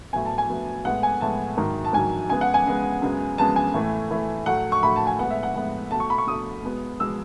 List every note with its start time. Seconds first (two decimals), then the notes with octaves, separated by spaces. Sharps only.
0.13 A2 F#3 B3 G#5
0.25 A5
0.38 G#5
0.50 A2 F#3 B3
0.85 A2 G#3 B3 F#5
1.03 G#5
1.21 A2 G#3 B3 A5
1.57 G#2 D#3 F#3
1.85 A5
1.93 G#2 D#3 F#3 G#5
2.30 C#3 G#3 B3 G#5
2.41 F#5
2.54 G#5
2.65 C#3 G#3 B3
3.02 F#2 C#3 G#3 B3
3.38 F#2 C#3 G#3 B3 A5
3.56 G#5
3.74 A2 E3 A3
4.11 A2 E3 A3
4.46 A2 F#3 A3 F#5
4.72 C#6
4.83 A2 F#3 A3 B5
4.96 A5
5.07 G#5
5.19 A2 G#3 B3 F#5
5.31 E5
5.43 F#5
5.55 A2 G#3 B3
5.91 B2 A3 A5
6.00 C#6
6.10 B5
6.18 C#6
6.27 B2 A3 D#6
6.63 B2 G#3 B3
7.00 B2 G#3 B3 E6